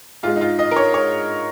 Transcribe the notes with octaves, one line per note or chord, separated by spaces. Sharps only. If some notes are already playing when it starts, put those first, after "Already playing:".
G#2 G#3 F4
D#4
F4
D#5
A#4
C#5
C#5